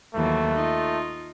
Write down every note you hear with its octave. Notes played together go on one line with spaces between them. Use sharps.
D#2 E3 F#3 A3
D#4 F4